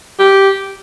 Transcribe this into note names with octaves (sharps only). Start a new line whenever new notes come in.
G4